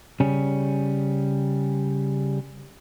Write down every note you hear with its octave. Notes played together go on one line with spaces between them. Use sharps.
C#3 G3 C#4